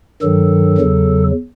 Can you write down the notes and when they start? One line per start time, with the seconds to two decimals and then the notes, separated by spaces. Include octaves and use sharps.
0.22 G2 D#3 F#3 A4
0.78 E2 C#3 F#3